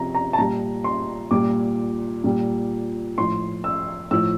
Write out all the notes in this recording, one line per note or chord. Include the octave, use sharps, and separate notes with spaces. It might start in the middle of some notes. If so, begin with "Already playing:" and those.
Already playing: C3 F3 A#5
A#5
A5
A#2 G3 A#5
C6
A#2 G3 D6
A#2 G3
A2 F3 C6
E6
A2 F3 E6